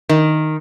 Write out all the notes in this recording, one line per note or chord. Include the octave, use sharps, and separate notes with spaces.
D#3